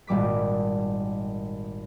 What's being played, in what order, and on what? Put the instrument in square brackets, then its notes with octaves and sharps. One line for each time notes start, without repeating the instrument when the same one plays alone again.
[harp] G#1 A#2 G3 D6 B6